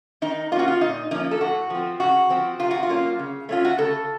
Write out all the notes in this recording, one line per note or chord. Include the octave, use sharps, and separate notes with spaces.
D#3 D#4
A#3 C#4 F4 F#4
F4
A#2 D#4
F3 A#3 C#4 D#4
A4
A2 F#4
F3 C4
C#3 F#4
F3 C4
C3 F4
F#4
F4
F#3 A#3 C#4
C#3
A3 C#4 F4
F#4
C#3 A4